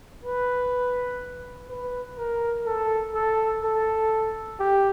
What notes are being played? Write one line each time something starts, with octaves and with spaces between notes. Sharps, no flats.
B4
B4
A#4
A4
A4
A4
G4